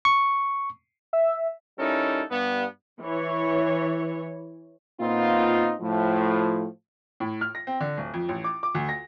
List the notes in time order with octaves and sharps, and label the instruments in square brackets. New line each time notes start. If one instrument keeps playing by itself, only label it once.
[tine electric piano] C#6
[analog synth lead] E5
[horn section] G3 C#4 D#4 E4 A4 A#4
G2 B3
[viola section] E3 C#5
[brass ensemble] A#2 B3 C4 D#4 F4
A2 F3
[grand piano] A2
F6
A#6
C4
D3
D1
F2
A1
D6
D6
D2
A#6